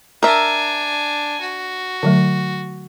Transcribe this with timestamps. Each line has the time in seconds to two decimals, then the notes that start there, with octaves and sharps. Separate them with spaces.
0.23 D4 A#4 E5 G#5
1.41 F#4
2.03 D3 F#3 A3